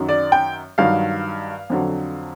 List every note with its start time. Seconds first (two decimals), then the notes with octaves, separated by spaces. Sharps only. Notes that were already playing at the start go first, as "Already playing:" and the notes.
Already playing: F#2 D#3 F#3
0.09 D5
0.32 G5
0.78 G2 D#3 F#3 F5
1.70 F2 D3 F#3